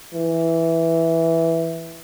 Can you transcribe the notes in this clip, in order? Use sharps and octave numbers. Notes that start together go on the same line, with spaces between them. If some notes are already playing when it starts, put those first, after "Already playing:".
E3